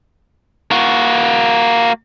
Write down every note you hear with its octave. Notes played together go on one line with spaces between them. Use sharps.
A#3 F#4